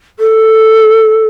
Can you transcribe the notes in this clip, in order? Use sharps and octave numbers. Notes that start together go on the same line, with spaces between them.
A4